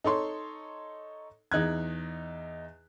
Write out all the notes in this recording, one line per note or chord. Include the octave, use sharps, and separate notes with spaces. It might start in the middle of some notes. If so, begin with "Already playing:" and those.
D#4 A4 C#5 C6
E2 D#4 F#6 G#6